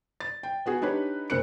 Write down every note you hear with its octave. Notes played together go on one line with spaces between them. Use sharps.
A6
G5
B3 F#4 G#4
D4 D#4 G4 B4 C#5
F#1 C4 A#4 F#6 C#7